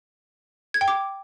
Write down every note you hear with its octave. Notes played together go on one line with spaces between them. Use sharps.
G#6
G5
D6